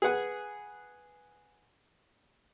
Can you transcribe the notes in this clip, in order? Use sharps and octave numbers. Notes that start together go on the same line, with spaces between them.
G#4 B4 F#5 G#5